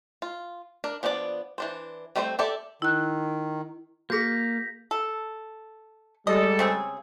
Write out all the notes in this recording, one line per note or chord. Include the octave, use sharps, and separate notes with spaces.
F4
D4 A#4
F3 B3 D4 F#4 D5
E3 D4 C5
G3 A3 C4 D4 C5
G4 A4 D5 E5
D#3 E4 F#6
A#3 F#4 G#4 G6 A#6 B6
A4
G3 G#3 A4 D#5
C#3 C4 G#4